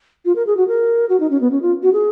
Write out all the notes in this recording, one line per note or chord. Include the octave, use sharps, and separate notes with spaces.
F4
A#4
G#4
F#4
A#4
F#4
D#4
C#4
B3
C#4
F4
F#4
G#4